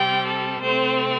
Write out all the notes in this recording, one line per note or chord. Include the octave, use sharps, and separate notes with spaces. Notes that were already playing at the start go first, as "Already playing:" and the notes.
Already playing: C3 G3 C4 G5
A4
C3 A3 C4 C5